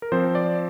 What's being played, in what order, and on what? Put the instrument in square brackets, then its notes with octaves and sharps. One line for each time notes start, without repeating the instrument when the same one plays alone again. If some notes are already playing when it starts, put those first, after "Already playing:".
[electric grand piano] A#4
F3 C4 C5
D5